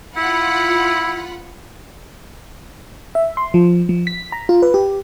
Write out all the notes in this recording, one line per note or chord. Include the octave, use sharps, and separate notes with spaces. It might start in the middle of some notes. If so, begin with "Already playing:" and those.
E4 F4 F#5 B5
E5
C6
F3
F3
B6
A#5
F4
B4
G4